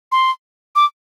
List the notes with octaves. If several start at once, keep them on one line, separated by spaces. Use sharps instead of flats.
C6
D6